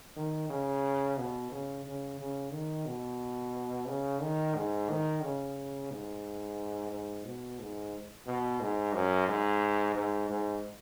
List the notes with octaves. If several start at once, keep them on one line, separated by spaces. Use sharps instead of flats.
D#3
C#3
B2
C#3
C#3
C#3
D#3
B2
C#3
D#3
G#2
D#3
C#3
G#2
G#2
B2
G#2
B2
G#2
F#2
G#2
G#2
G#2